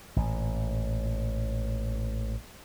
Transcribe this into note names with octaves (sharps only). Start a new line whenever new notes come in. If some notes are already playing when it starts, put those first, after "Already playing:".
A1 A#2